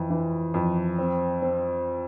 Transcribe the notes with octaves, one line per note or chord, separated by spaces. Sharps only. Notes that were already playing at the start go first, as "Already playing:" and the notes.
Already playing: F2 E3
E3
F2
C4
C4